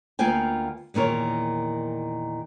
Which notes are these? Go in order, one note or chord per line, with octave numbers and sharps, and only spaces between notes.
D2 A#3 B3 F4 G5 G#5
E2 A#2 D#3 A#4 C#5